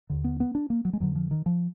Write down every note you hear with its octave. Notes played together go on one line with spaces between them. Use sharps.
D#2 D3
B3
B3
D4
A#3
F#3
G#3
F2 D3 F#3
F3
D#3
F3